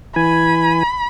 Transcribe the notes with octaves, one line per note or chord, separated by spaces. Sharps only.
E3 G#5 B5